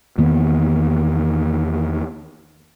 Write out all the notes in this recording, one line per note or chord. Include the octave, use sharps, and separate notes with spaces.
E2 D#3 A#3 B3